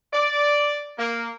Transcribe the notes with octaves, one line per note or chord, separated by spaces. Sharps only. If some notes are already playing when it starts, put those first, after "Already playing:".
D5
A#3